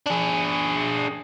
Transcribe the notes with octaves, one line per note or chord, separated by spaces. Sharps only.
D4 G#4